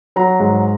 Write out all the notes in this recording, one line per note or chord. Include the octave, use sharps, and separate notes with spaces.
F#3 A#5
G#2